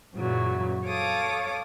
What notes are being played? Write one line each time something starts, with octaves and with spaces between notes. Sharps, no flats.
F#2 A#2 C#3 E3 F#3
A4 C#5 F5 D6 D#6